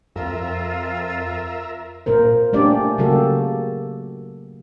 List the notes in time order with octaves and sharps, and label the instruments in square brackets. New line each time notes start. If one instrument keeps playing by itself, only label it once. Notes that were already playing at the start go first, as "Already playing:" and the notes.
[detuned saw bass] F2 [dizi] F4 [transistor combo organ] A#4 E5
[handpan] A#2 A#3 A#4 C5
A3 A#3 C#4 D4 G4 D5
C#3 F#3 A#3 F#4 G4 A4